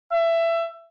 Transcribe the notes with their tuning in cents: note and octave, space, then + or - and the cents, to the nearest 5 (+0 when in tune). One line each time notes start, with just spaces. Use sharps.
E5 +20